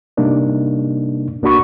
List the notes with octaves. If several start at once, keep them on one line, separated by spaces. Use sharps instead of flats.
C3 G3 A#3 D4 D#4
C2 A#3 D4 F#4 B5 C#6